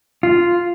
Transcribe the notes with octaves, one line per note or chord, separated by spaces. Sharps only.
F4